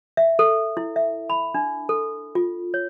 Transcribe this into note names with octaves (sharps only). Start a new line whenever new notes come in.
E5
A4
E4
E5
B5
D4
A4
F4
C#5